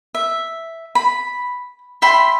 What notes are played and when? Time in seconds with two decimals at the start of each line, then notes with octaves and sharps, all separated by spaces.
0.15 E5
0.95 B5
2.02 E5 G5 B5 C6